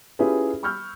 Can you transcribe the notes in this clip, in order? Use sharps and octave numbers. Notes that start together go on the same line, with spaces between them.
C#4 E4 F4 G4 G#4 B4
B5 C#6 E6 F6 G6